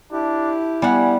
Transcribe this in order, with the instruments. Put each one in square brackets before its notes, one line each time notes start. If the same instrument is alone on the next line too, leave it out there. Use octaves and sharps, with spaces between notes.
[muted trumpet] D4 [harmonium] E4 G4
[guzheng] G3 F#5 [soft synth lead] B3 [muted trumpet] G#5